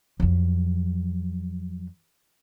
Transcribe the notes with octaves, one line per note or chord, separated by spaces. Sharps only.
F2 F#3